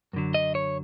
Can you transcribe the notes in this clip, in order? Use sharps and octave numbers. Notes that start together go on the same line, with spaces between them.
F#2 D3 F#3
D#5
C#5